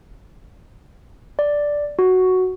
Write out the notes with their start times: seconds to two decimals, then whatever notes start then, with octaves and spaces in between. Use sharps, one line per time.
1.39 D5
1.99 F#4